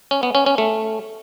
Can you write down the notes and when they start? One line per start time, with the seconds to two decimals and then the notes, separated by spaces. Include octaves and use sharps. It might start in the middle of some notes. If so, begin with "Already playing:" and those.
0.11 C#4
0.23 B3
0.35 C#4
0.46 C#4
0.58 A3